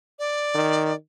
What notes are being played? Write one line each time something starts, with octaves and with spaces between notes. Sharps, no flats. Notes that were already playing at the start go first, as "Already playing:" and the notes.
D5
D#3